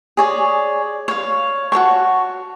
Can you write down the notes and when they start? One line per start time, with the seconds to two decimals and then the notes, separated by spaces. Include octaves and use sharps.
0.17 G#4 C#5 D5
1.08 C#5 F5
1.72 F#4 A#4 A5 C#6